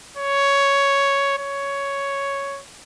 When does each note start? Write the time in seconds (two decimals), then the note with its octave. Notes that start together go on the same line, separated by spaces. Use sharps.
0.17 C#5
1.38 C#5